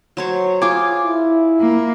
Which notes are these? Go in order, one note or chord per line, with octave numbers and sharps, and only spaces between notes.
F#3 C5 C#5
F4 G#4 G#5 D6
E4
A#3